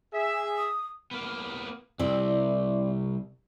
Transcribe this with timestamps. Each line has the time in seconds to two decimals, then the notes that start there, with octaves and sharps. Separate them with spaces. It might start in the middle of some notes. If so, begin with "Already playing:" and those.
0.14 G#4 E5
0.57 D#6
1.11 A#3 B3
1.99 C2 C4 E4 D5